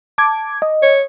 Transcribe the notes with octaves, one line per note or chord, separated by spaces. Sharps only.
A5 D6 G#6
D#5
C#5